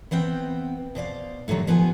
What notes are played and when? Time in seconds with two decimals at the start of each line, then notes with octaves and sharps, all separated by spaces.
0.11 E3 B3 C4 G5
0.95 B2 C5 D5 F5
1.48 A2 D3 D#3 F#3 G3
1.67 G2 F3 B3 B4 G#5